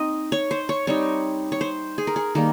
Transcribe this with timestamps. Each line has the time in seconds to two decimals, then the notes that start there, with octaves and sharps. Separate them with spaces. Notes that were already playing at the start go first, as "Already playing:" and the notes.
Already playing: C4 D#4 D#5
0.32 C#5
0.51 C5
0.69 C#5
0.87 G3 C4 D#4 C#5
1.52 C#5
1.61 C5
1.98 G#4
2.07 A#4
2.16 G#4
2.35 D#3 G3 A#3 A#4